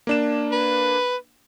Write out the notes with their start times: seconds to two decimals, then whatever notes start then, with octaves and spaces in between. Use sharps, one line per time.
0.07 A#3 D4 E7
0.51 B4